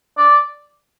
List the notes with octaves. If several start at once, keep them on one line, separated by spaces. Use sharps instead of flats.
D5